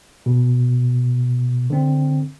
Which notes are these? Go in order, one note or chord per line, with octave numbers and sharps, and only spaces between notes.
B2
D3 C4